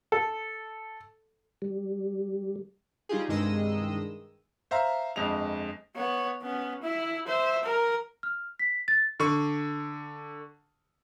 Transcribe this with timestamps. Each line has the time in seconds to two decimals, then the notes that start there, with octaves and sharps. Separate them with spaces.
0.12 A4
1.62 G3
3.09 G3 D#4 F4 G4 G#4
3.28 C2 G2 D#3 G#3 D#5 E6
4.71 C5 E5 F5 A#5
5.16 G1 F2 G#3 F7
5.95 B3 C#5
6.42 B3 C#4
6.82 E4 E5
7.27 C5 E5
7.63 A#4
8.23 F6
8.59 B6
8.88 A6
9.20 D3 C#6